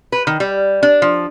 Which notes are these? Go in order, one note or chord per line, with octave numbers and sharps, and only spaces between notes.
B4
D#3
G3
D4
F3